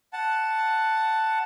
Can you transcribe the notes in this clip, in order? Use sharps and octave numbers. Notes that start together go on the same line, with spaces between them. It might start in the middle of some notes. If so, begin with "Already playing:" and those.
F#5 A5